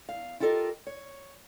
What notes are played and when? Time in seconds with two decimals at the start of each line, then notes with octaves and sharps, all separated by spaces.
0.09 E2 F5
0.40 E4 F4 G4 A4 A#4 D#5
0.87 C#5